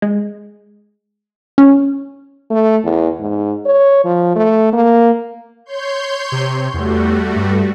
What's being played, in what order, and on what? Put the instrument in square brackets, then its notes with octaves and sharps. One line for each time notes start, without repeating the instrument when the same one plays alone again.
[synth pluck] G#3
C#4
[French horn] A3
E2
G#2
C#5
F3
A3
A#3
[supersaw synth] C#5 C6 G6
[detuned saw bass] C3
[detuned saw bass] E2 [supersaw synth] G3 A3 F#4
[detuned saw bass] G2